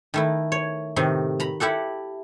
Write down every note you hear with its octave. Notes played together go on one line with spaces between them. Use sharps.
D#3 A3 E4
C#5
A2 C3 D#3
A#5 B5
E4 G4 A4 F#5